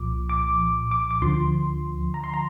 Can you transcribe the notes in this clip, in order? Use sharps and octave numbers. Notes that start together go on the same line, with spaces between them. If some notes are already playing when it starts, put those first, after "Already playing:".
Already playing: C2 A#2 F3 D6
D6
D6
D6
D2 D3 F3 C6
A#5
C6
A#5